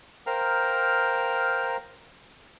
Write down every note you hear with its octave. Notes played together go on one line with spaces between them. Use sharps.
A#4 C5 F5 G5 A#5 F6